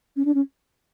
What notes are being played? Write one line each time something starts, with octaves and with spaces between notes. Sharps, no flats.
C#4
D4
C#4